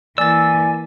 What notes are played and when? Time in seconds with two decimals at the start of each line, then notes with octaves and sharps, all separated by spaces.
0.18 E3 A#3 D5 G#5 E6 A6